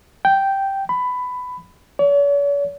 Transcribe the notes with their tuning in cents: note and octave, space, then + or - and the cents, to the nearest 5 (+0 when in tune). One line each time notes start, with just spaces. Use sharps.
G5 -5
B5 +15
C#5 +45